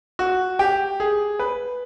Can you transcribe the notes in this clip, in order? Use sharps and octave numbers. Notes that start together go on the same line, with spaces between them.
F#4
G4
G#4
B4